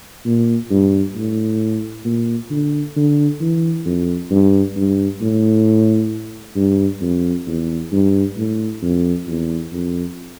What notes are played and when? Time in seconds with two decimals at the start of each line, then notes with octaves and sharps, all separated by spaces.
0.25 A#2
0.71 G2
1.16 A2
2.05 A#2
2.51 D3
2.96 D3
3.41 E3
3.85 F2
4.31 G2
4.76 G2
5.22 A2
6.56 G2
7.01 F2
7.47 E2
7.92 G2
8.37 A2
8.82 F2
9.27 E2
9.72 F2